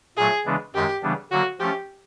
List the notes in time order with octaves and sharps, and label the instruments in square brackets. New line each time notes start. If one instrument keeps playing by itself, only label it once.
[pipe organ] A#2 F#3 A3 [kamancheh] G#4
[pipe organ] C#3 E3 G#3 B3 D4
[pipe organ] F#2 D#3 G#3 [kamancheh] G4
[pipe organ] C#3 E3 G3 B3 D4
[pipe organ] D3 F#3 A#3 [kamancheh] F#4
[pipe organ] F3 A3 C#4 [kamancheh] G4